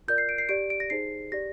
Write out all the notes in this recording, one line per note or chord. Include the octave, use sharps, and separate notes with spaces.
F4 A#4 D5 G6
C7
D7
C7
G4 D5 D7
D7
A#6
D#4 G#4 C5 C7
G4 D5 A#6